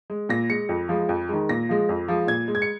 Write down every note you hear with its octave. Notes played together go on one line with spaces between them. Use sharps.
G#3
A#2 A#6
G#3 C#7
F2
F3 G#3
F2
D#3 G#3
A#2 A#6
F3 G#3
F2
F3 G#3
A#2 G#6
G#3
G#6
C#7